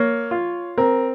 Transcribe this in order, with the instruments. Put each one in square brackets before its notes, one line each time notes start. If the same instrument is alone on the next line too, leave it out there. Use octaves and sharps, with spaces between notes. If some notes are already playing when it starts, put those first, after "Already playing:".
Already playing: [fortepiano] A#3 [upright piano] C#5
[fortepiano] F4
[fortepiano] C4 [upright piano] A#4